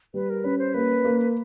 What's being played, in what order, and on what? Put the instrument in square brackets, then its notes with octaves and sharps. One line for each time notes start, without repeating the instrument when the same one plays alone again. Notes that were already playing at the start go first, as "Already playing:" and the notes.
[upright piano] G3 [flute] B4
[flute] A#4
[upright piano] C#4 [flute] B4
[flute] C5
[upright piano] A#3 [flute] B4
[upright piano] A#3